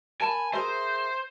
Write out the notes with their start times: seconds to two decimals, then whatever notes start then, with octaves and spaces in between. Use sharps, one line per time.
0.21 A#4 G#5 A5 B5
0.53 G#4 A#4 C5 E5